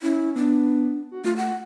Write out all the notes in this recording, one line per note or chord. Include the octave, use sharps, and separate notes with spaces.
C#4 E4
B3 D4
F#4
A3 F4
F#5